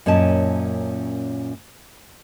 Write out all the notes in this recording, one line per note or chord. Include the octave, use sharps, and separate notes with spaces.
F#2 A#2 C#4 D#5 A5